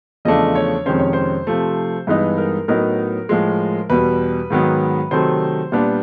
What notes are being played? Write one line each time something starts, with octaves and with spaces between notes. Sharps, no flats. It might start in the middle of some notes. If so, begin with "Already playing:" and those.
E2 C#3 F3 A3 D4 D#5
C#5
F2 C3 D#3 G#3 C#4 C5
C#5
C5
C3 F3 A3
G2 E3 G#3 B3 D#4 B4
A#4
A2 F#3 B3 D#4 A#4
A2 F3 G#3
E2 B2 G3 B4
G#2 D#3 F#3 B3
C3 D#3 F#3 A3 C5
A#2 G3 B3 D4